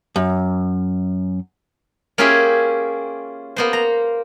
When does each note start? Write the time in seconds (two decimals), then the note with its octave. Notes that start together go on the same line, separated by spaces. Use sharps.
0.16 F#2
2.18 A#3 C#4 F4 G4 G#4 E5
3.56 A#3 B3 C5
3.73 A#5